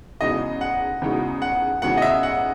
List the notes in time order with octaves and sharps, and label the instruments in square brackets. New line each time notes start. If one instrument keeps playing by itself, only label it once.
[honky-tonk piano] E2 C#3 G#3 D#4 F#4 [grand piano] D#5
[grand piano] F#5
[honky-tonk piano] E2 C#3 G#3 D#4 F#4
[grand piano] F#5
[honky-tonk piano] E2 C#3 G#3 D#4 F#4 [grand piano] F#5
[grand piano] D#5
E5
F#5